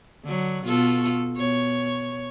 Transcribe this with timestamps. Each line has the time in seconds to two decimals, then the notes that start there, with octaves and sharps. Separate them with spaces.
0.24 D3 F#3
0.65 B2 F4 A4
1.37 B2 C#5